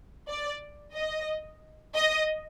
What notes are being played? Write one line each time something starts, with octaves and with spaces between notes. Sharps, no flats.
D5
D#5
D#5